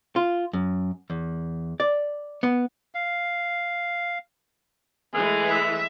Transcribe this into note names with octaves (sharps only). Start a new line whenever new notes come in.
F4
F#2
E2
D5
B3
F5
E3 G#3 A3 G#4
E5